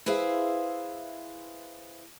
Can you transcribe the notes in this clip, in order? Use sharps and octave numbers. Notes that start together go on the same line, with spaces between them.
E4 G#4 B4 C5 E5 F5